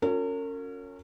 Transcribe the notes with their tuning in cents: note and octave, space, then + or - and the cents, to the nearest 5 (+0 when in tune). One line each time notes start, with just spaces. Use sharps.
C#4 +0 F4 +45 A#4 -40